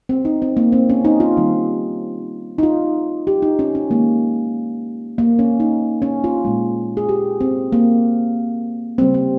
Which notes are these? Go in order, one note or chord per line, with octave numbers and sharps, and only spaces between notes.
C4
D#4
C4
A#3
C4
C#4
D#4
F4
D#3 G3 A#3
D#4
F4
G4
D#4
C#4
C#4
D#3 G#3 A#3
A#3
C#4
D#4
C#4
F4
A#2 G#3
G#4
G4
C4
A#3
C#3 G3 A#3 C4
C4